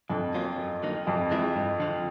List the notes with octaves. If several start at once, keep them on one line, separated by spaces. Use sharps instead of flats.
F2 D3
F#3 A#3 C#4 F4
F#2
D3 F#3 A#3 D#4
F2 C3
E3 G#3 C4 E4
G2
D3 F3